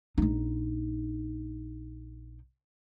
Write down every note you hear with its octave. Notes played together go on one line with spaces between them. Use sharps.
A#1 D#4